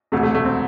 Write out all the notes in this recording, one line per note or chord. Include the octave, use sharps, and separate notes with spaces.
E1 D2 C3 A3
A3
A3
C4